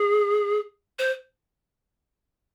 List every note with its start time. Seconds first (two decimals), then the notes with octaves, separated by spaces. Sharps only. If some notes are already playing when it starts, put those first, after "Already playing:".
Already playing: G#4
0.99 C5